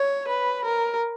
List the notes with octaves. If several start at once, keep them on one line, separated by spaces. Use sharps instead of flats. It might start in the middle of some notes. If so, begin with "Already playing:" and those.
Already playing: C#5
B4
A#4